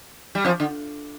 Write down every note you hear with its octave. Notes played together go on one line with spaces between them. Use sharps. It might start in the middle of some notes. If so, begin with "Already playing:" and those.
G3
F2 F3
D3